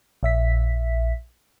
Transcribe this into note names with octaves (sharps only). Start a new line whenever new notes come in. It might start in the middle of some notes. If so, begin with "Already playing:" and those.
A#1 E5 B6